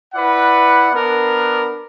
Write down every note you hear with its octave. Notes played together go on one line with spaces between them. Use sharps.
E4 B4 D5 F#5
B3 D4 A#4